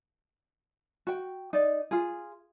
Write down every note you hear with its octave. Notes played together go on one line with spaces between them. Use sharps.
F#4 G5
D#4 D5
F4 G#4